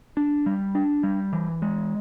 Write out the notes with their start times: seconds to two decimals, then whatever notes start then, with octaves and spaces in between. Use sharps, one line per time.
0.17 D4
0.46 G3
0.75 D4
1.03 G3
1.33 E3
1.62 G#3